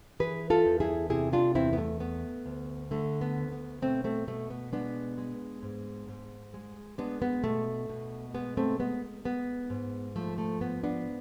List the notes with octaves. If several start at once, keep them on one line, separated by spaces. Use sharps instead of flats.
E3 G#4 B4
F4 A4
E2
E4 G#4
C3 E4 G#4
D4 F4
E2 C4 E4
B3
A3
A3 B3
D2
D3 A3
B3
D2
B3
B2 A3 C4
A3 C4
B2 A3
B3
G#3 B3 D4
G#3
G#2
G#2
G#3
G#3 B3 D4
B3
B2 A3
B2
G#3 B3
A3 C4
G#3 B3
G#3 B3
G#2
F3 A3
A3
G#2 B3
B3 D4